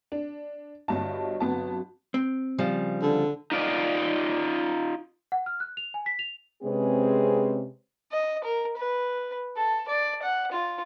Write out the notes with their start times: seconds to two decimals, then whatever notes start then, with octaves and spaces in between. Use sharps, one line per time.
0.12 D4
0.88 G1 G2 F#4 C#5 D#5 A5
1.40 G1 F#3 B3 C4 F#4 A5
2.14 C4
2.58 C#3 F3 G3
3.02 D3
3.52 D#4 F4 D5 D#5
5.32 F#5
5.46 F6
5.60 F#6
5.77 F7
5.94 G#5
6.06 B6
6.19 F7
6.63 C3 G#3 C4 C#4 G#4 B4
8.12 D#5
8.44 A#4
8.77 B4
9.56 A4
9.88 D5
10.23 F#5
10.52 F4